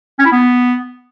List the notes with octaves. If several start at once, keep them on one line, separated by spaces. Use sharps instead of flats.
C#4
E4
B3